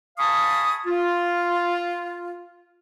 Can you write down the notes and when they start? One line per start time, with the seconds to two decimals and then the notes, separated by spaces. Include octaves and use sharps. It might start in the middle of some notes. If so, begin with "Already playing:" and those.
0.18 F5 G#5 A5 B5 C#6 D#6
0.86 F4